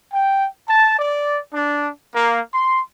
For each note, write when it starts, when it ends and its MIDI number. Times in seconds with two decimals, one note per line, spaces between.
0.13 0.48 79
0.69 0.94 81
0.99 1.40 74
1.54 1.91 62
2.15 2.42 58
2.54 2.80 84